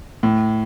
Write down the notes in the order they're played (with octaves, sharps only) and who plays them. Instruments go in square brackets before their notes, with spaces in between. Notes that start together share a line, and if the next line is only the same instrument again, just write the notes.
[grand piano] A2